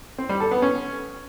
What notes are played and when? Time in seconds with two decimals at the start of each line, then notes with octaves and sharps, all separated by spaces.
0.18 C4
0.29 G3
0.40 A4
0.51 B3
0.62 C#4